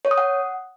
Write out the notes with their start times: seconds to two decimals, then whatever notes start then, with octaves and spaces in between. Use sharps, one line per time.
0.05 C#5
0.11 D#6
0.18 F#5